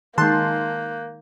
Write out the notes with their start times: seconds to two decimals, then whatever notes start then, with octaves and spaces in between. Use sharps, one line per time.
0.18 D#3 G#3 A#3 A5 C6 F#6 G6